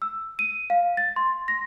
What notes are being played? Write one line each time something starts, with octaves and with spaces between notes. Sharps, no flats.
E6
D#7
F5
A6
C6
A#6